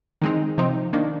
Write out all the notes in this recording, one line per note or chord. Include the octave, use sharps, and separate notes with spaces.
D#3 G#3 C4 D#4
C3 F3 C4 D#4
D#3 A#3 D4